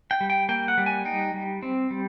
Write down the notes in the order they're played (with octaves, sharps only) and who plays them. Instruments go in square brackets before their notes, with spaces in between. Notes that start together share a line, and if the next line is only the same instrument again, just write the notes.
[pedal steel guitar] G5
G3
G5
A#3 G5
F#5
G3
G#5
D#4 G5
G3
C4
G3